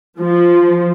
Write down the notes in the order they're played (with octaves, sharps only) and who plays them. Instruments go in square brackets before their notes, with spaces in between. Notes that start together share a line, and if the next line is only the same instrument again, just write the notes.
[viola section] F3